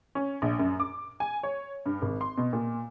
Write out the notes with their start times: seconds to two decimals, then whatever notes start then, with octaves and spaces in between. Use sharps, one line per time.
0.15 C#4
0.42 A#1
0.59 F#2
0.80 D6
1.20 G#5
1.43 C#5
1.86 G2
2.02 G#1
2.21 C6
2.37 B2
2.53 A#2